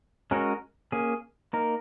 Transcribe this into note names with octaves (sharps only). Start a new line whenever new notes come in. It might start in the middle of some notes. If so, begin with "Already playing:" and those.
G#3 C#4 F#4 A#4 C#5
A#3 C#4 G#4
A#3 D#4 A#4